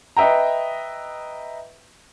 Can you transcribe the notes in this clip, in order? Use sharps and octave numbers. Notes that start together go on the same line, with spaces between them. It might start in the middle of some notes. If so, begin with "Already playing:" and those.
B4 D#5 E5 G5 A#5